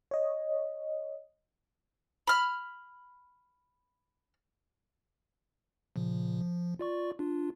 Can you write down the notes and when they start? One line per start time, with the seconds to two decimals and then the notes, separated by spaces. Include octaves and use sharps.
0.11 C#5 D#5
2.27 B5 F6
5.96 A#2 C#3 F3
6.41 F3
6.79 F4 D5 C#6
7.19 D4 F4